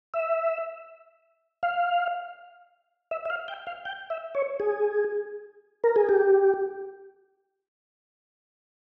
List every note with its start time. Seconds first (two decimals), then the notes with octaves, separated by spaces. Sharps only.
0.14 E5
1.63 F5
3.11 E5
3.25 E5
3.30 F5
3.48 G5
3.67 F5
3.85 G5
4.10 E5
4.35 C#5
4.60 G#4
5.84 A#4
5.96 G#4
6.09 G4